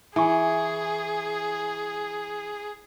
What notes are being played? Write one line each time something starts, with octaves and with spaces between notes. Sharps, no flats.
E3 G#4 G#5 C#6